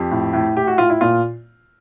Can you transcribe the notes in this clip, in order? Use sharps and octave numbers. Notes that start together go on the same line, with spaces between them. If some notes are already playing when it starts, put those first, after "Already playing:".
Already playing: F2 G4
A2
A2
A2 G4
F#4
A2 F4
E4
A#2 F4